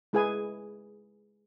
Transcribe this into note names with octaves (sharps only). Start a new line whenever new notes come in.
G#3 E4 G#4 B4 G#5